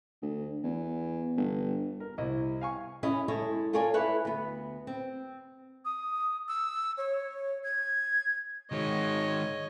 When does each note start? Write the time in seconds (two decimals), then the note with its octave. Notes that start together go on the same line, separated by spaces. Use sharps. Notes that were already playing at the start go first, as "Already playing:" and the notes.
0.23 D2
0.64 E2
1.37 G1
2.00 A#4
2.18 C2 E4 D#5
2.61 F5 G#5 C#6
3.03 E2 C#4 E4 G#4 D#5
3.28 G#3 E4 G#4 A4 C#5
3.73 F4 A4 A#4 C#5 D5 G#5
3.94 E4 A4 B4 C#5 D5
4.25 D2 B3
4.87 C4
5.85 D#6
6.48 E6
6.97 C#5
7.63 G#6
8.72 D#3 G#3 C#5 D#5